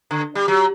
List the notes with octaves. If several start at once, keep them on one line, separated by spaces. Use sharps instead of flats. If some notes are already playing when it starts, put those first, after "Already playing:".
D3
G3
F#3